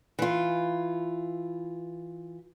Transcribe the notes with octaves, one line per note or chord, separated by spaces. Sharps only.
E3 F4